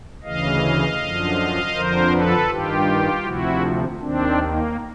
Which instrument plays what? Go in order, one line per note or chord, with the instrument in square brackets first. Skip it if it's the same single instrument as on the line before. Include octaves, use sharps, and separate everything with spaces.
[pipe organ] D2 C#3 E3 D#5 F5
F#2 D3 F3
F2 D3 F3 A#4 C5
A4 B4
G2 D#3 F4 G4
D2 C3 F3 E4 F#4
D#2 D#3 C4 D4
A#3